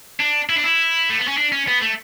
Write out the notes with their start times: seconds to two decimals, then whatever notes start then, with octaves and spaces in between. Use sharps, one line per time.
0.20 D4
0.49 E4
0.56 D4
0.64 E4
1.10 A3
1.19 B3
1.28 C#4
1.37 D4
1.52 C#4
1.67 B3
1.82 A3